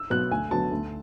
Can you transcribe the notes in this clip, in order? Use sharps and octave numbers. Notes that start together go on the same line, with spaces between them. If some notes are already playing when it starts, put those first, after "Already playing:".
Already playing: E6
B2 F#3 B3 F#6
D2 G#5
D3 F#3 B3 A5
D2